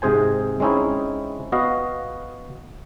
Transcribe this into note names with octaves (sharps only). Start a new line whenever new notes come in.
G#2 C3 G#4 C5 G#5
G#3 C4 C#4 D#4 E4
B3 F#4 D#5 F5